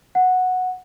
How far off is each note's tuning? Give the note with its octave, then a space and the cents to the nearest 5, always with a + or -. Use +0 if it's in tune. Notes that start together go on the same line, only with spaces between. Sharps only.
F#5 -5